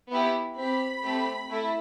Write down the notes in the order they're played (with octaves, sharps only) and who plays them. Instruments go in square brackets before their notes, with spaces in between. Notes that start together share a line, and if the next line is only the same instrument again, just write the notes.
[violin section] B3 E4 G4
C4 G4 B5
A3 C4 G4
A3 E4